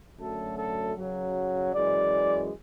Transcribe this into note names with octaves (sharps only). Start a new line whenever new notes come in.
F#2 D3 F#3 A3 A4
A4
F#2 C#3 F#3
F#2 E3 G#3 D5